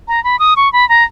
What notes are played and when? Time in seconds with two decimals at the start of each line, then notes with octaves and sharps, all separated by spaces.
0.08 A#5
0.24 B5
0.39 D#6
0.56 C#6
0.73 B5
0.89 A#5